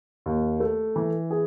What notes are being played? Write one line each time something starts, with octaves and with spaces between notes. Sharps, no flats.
D#2
A3
E3
G#4